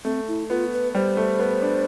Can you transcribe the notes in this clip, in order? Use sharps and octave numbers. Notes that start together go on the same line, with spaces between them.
A3 C4
E4
B3 F4
B4
G3 C5
A3
B3
D4